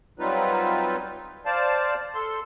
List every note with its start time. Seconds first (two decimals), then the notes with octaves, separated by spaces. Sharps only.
0.19 F#3 G3 C4 D#4 F4 B4
1.46 C5 D5 F5 A5
2.15 A4 C6